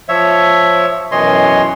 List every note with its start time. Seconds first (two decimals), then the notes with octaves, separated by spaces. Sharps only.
0.09 F3 C#5 E5
1.12 F#2 B2 E3 C#5 D#5 C6